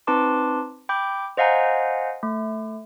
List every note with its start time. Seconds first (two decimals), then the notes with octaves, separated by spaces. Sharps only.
0.07 C4 D#4 B4 A5 C6 D6
0.89 G5 B5 D6 G6
1.37 C5 D#5 F5 F#5 G#5 A#5
2.23 A3